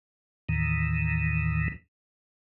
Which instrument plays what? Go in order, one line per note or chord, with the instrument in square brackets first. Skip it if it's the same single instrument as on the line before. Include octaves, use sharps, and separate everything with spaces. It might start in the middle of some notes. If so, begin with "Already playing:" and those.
[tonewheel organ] D#2 A2 D#3 E3